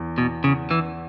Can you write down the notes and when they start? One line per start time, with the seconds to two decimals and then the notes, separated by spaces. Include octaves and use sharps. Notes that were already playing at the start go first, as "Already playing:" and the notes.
Already playing: E2
0.18 B2
0.44 C#3
0.71 E3